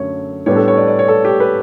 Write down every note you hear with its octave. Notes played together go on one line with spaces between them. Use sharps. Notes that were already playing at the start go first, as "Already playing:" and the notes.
Already playing: F#2 D3 F#3 A3 C#4 C#5
A2 G3 B3 D4 C#5
A4
C#5
D5
D5
C#5
A4
G4
B4